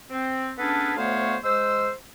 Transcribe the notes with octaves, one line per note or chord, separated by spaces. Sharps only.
C4
B3 C#4 D4 G#4 A4 B4
D2 A3 B3 C5 C#5 F5
G#3 C5 E6